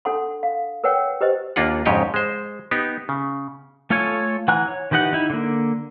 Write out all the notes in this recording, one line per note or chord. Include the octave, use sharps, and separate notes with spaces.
D4 A4 F#5 C6
F5
A#4 B4 C#5 F#5 G5
G4 B4 C5 D#5
D#2 A#3 D4 F4 F#5
F2 G#2 C#3 G4 C#5 D#5
G#3 C5
B3 D#4 G4
C#3
A3 F4 A4 C#5 G#5
E3 F#5 G#5 A#5 F#6
C#5
D#3 E3 G4 D#5 F#5
D#4 E4
D3 A#3